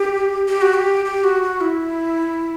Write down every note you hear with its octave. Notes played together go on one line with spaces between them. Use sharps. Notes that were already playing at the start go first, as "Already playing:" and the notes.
Already playing: G4
G4
F#4
G4
G4
F#4
F#4
E4